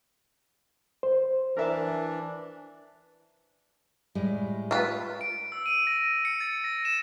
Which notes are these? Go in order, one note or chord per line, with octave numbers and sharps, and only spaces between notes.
C5
E3 D4 A#4 E5 A5
A2 G3 G#3
F4 B4
D7
E6
D#7
A#6
C#7
A6
A#6
E7